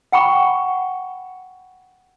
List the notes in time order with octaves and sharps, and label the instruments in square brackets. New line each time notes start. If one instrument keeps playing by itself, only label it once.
[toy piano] F#5 G5 B5 C#6